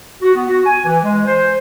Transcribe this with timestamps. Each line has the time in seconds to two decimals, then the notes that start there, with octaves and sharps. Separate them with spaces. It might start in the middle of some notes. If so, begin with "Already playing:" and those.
0.22 F#4
0.35 B3
0.49 F#4
0.66 G#5
0.85 E3
1.04 G#3
1.26 C5